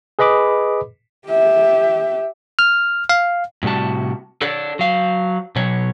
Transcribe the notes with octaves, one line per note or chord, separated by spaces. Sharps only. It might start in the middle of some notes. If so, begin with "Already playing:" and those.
G#4 B4 D#5 B5 D6
G4 E5
F6
F5
A2 C3 G3 F#4 A5
D4 A4 C#5
F#3 F5
B2 F#3 C#5